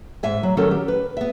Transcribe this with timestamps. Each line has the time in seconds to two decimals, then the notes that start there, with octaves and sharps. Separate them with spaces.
0.23 G#2 E5 G#5
0.43 F#3
0.57 D#3 F#3 C#4 A4 A#4
0.71 G4
0.88 B4
1.17 B3 E5